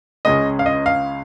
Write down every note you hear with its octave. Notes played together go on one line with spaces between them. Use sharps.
C#2 C#3 G#3 C#4 D#5
F5
D#5
F5